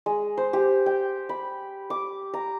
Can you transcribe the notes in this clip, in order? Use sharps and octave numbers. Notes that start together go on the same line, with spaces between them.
G#3
C5
G4
G5
B5
D6
A#5